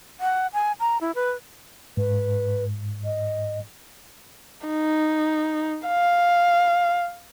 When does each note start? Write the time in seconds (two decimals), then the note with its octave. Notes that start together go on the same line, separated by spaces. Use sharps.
0.21 F#5
0.53 G#5
0.80 A#5
1.01 E4
1.15 B4
1.97 G#2 B4
3.05 D#5
4.67 D#4
5.88 F5